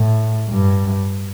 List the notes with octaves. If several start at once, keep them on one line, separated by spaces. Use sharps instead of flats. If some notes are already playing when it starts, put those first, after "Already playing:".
Already playing: A2
G2